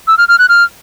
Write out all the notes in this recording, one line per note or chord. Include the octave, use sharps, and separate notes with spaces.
E6
F6
F6
F#6
F6